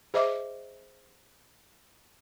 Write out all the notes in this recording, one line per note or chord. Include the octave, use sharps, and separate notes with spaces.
G#4 C5 D#5 E5 D6